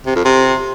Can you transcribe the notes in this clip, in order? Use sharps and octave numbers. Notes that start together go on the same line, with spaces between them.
C3
F2
C3